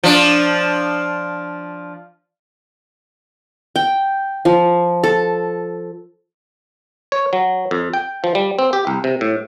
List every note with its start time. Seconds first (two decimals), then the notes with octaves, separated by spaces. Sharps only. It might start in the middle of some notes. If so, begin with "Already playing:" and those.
0.04 F3 D4
3.76 G5
4.45 F3
5.04 A4
7.12 C#5
7.33 F#3
7.71 F2
7.93 G5
8.24 F3
8.35 G3
8.59 C4
8.73 G4
8.87 C2
9.04 C3
9.21 A2